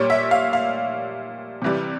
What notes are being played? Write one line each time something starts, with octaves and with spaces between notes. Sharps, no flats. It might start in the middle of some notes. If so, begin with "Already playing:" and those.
Already playing: A#2 G3 C#5
E5
F5
F5
C3 E3 G3